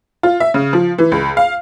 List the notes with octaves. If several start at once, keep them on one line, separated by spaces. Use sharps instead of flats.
F4
E5
C#3
F3
E3
C#2
F5